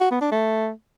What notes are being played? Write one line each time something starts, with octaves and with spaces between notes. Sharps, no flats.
F#4
B3
D4
A3